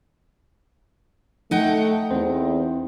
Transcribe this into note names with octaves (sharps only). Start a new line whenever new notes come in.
A3 D#4 F#5 G5
E2 C4 C5